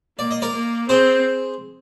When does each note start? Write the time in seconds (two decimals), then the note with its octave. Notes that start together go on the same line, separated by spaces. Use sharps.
0.19 A#3 D5
0.31 D#5
0.42 A#4 D5
0.55 A#3
0.89 C4 G#4 C5